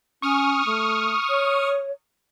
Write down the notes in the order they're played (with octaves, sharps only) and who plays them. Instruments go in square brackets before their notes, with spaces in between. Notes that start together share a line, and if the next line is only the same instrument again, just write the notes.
[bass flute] C#4 [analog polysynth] C#6 D#6 F6
[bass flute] A3
C#5